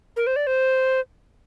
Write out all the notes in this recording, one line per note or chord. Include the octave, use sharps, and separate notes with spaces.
A#4
C5
D5
C5